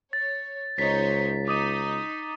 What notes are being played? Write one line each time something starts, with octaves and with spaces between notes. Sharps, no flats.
C#5 A6
C#2 D#4 C5 C#5 B6
D#4 D6 D#6 D#7